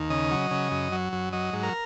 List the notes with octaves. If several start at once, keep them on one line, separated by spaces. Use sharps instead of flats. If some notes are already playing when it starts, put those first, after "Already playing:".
Already playing: D#2
C#3 D#5
F#3
C#3
F#2
F#3
F#2
F#3 D#5
G#2
A#4